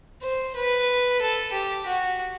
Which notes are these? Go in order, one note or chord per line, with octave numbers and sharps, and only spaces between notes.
C5
B4
A4
G4
F#4